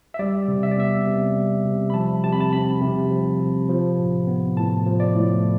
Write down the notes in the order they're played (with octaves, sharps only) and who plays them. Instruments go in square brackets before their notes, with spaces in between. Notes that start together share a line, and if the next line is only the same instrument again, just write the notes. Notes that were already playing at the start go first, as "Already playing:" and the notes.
[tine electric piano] E5
G3 D5
C3
E5
D5
B3 E5
C3
G3
C3
B5
F3 A5
C3 A5
B5
A5
C4 B5
C3
F3
C3
F3
A2
B3
A2 A5
F3
D5
A2